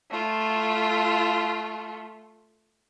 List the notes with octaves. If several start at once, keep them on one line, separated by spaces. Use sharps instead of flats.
A3 F4